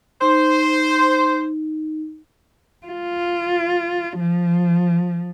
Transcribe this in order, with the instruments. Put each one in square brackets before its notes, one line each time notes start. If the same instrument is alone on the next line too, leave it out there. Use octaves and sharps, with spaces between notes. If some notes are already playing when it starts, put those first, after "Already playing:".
[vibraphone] D#4 [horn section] C5
[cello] F4
F3